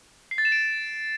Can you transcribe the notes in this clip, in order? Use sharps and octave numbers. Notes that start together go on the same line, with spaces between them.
C7
A6
E7
D7